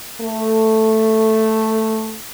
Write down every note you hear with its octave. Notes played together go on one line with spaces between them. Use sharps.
A3